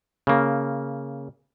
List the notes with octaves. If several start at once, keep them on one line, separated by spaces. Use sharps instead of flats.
C#3 A#3